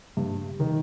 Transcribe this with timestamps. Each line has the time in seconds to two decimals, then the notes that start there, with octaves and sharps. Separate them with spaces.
0.17 G2
0.60 D#3